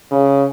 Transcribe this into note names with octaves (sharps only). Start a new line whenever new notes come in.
C#3